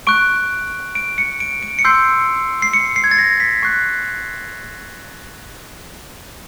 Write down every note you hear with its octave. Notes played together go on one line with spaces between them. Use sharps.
C#6 F#6 D7
D7
C#7
D7
D7
C#7
C6 E6 G6 C7
C7
C#7
C7
G#6
A6
A#6
B6
C#6 F#6 C7